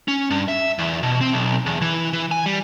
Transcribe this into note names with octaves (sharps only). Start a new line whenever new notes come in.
C#4
G2
E5
E2
B2
C4
B1
E2
E3
E3
G#5
G3